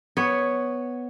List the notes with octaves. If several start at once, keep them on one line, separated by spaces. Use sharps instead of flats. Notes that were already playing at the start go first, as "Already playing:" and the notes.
B3 C#5